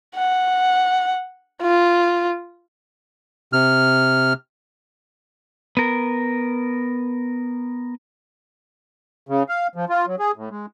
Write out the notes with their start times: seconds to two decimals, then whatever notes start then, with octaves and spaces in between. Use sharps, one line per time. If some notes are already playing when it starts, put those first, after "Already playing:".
0.16 F#5
1.62 F4
3.53 C3 F6
5.77 B3 A#4
9.29 C#3
9.49 F5
9.75 F3
9.89 F4
10.07 F#3
10.19 G#4
10.36 A2
10.50 G#3